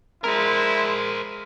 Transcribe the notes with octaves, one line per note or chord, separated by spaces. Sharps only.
G#3 E4 A#4 C5